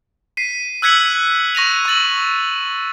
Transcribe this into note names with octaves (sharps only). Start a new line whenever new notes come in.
B6 C7 D#7
E6 F#6 G#6 B6 C#7 F#7
C#6 A#6 D#7 F7
C#6 E6 A6 F#7